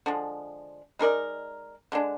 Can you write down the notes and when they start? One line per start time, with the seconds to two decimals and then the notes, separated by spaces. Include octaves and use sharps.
0.06 D3 F3 G#3
0.99 G#3 D#4 A#4 D5
1.92 D3 G#3 D4